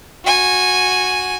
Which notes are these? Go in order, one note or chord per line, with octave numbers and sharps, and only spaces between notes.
F#4 G#5